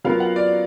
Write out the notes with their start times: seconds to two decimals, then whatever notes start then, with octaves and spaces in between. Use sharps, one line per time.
0.04 F#3 B3 F4 A#4 F5
0.20 F#5
0.36 D5